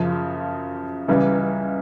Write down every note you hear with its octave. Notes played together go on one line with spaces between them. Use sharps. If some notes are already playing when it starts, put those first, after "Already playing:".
Already playing: F#2 C#3 F3
C#2 C#3 E3 G3